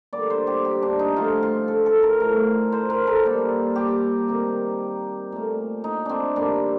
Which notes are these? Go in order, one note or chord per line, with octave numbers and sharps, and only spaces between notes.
D3 G3 A#3 D5
C5
G4
G4
D4
D#4
D3 F3 A3 F4
F4
A4
A4
A#4
A2 A3 A#4
C5
A#4
A4
A#2 G3 A#3
G4
C3 D#3 A#3
A#2 A3
D#4
C4 D4
G2 D#3 G3 A#3 D4